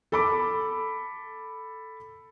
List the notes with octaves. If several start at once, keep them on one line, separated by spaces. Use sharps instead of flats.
A4 B5 D6